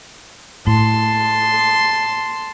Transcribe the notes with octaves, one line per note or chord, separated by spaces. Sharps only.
A2 A5 C6